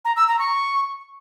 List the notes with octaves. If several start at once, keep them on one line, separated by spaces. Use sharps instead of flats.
A#5
E6
A#5
C#6